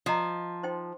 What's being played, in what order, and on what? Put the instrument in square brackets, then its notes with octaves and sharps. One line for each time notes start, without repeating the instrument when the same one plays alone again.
[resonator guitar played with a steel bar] F3 [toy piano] F4 D#5 A#5
[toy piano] D#4 C5 G5 C6